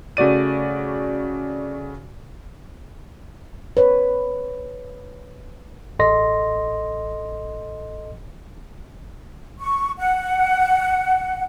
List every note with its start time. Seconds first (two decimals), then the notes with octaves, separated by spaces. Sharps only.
0.17 C#3 A3 F#4 D5 D#7
3.77 B4 C#5
5.99 A1 A4 D#5 C6 A#6
9.59 C#6
9.98 F#5